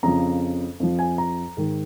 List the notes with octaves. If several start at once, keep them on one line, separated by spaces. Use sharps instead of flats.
F2 C#3 F3 A#5
F2 F3
G#5
A#5
G#2 D#3